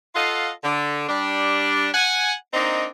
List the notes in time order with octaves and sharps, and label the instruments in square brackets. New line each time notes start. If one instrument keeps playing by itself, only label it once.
[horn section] F4 A4 D#5 F5 F#5
D3
G3 D4
F#5 G#5
A#3 C4 D4 D#4